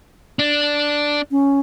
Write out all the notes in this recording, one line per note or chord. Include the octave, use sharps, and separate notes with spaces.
D4
C#4